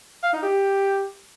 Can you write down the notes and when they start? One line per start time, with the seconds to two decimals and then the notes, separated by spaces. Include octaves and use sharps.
0.23 F5
0.33 D#4
0.43 G4